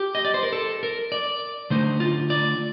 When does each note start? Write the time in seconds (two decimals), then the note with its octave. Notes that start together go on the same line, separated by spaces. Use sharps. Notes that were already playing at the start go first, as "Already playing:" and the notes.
Already playing: G4
0.15 D#5
0.25 D5
0.34 C5
0.43 A#4
0.53 A4
0.83 A#4
1.12 D5
1.70 D3 A3 D#4 C5
2.00 F4
2.30 D5